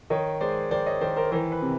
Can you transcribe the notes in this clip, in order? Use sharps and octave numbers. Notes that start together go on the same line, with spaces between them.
D#3 C#5 D#5
G#3 C5 D5
D#3 C5 D5
C#5 D#5
D#3 C5 D5
A#4 C5
E3 A#4 C5
B4
C3